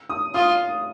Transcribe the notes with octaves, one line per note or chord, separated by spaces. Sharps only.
D#6
F4 D#6